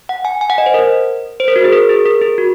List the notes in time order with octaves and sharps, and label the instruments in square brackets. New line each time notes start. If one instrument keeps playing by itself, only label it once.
[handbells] F#5
G#5
G#5
F#5
D#5
C5
A#4
C5
A#4
F#4
G#4
A#4
G#4
A#4
G#4
F#4